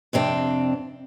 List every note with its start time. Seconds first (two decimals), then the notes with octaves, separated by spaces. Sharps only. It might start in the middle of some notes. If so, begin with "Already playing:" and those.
0.13 F2 C3 C4 D4